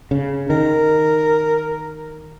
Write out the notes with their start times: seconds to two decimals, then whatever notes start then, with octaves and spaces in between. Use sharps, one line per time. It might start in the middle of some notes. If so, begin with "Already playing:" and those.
0.11 C#3
0.50 D#3 A#4